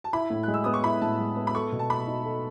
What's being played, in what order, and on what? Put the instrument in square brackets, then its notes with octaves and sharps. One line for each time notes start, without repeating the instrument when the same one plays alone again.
[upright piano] A5
[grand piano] E4 [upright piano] B5
[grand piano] A2
[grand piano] G#3 [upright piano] F#6
[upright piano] E6
[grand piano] B3 [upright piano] D#6
[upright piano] C#6
[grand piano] E4 [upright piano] B5
[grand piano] A2 [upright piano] A5
[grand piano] G#3
B3
[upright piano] B5
[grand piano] A4 [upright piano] C#6
[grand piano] B2
[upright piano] A5
[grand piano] A3 [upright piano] B5
[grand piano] D#4
A4